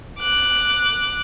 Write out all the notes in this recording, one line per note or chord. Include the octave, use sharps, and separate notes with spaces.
D6 F#6